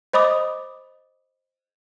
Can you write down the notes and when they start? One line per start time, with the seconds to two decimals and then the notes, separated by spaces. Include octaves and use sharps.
0.13 C5 D#5 B5 D6 D#6